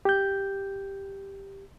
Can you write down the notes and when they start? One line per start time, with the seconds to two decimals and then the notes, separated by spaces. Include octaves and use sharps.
0.05 G4 G6